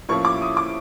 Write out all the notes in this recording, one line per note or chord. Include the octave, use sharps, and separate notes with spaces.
A2 F3 A#3 C#4 E4 C#6
D6
D#6
D6